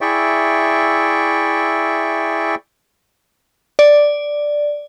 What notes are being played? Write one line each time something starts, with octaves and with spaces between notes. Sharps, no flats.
E4 G#4 D5 E5 G5 C#6
D5